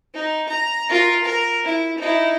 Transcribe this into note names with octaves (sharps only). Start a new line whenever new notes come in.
D#4
A#5
F4 A#4
A#4
E4
D#4 E4